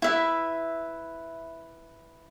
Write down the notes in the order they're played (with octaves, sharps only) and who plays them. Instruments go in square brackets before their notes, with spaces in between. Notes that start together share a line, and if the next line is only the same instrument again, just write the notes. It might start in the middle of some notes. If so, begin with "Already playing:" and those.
[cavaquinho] E4 B4 E5